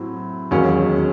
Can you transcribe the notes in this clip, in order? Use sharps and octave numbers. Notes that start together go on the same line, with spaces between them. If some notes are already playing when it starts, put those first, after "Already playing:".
Already playing: A2 F#3 C4 E4
E1 D#2 D#3 F#3 C#4